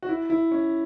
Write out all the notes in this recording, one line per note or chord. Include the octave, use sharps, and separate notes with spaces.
F#4
E4
E4
C#4